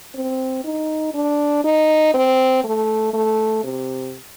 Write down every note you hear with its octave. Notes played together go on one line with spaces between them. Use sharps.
C4
D#4
D4
D#4
C4
A3
A3
C3